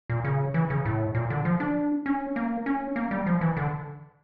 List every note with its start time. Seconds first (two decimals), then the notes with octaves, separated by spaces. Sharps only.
0.10 A#2
0.25 C#3
0.54 E3
0.70 C#3
0.86 A2
1.15 A#2
1.30 D3
1.45 F3
1.60 D4
2.06 C#4
2.36 A#3
2.66 C#4
2.96 A#3
3.11 G3
3.26 F3
3.41 E3
3.57 D3